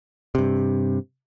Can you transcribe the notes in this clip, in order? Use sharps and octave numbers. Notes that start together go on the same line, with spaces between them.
G2 C3